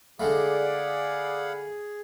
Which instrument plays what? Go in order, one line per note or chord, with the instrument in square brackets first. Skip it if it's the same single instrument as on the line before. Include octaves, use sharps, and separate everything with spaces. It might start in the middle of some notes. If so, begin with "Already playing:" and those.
[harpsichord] D3 G#3 A3 [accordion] G#4 [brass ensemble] D5 [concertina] F5 F#5 B5